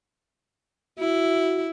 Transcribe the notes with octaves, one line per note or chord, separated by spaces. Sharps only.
E4 F#4